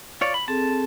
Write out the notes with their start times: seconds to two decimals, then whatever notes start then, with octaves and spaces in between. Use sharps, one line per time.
0.21 F4 C#5 D5
0.34 B5
0.48 C4 G#4 A4 A5